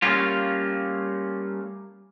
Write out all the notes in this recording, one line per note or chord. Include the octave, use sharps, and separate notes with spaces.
G3 A3 A#3 C#4 F4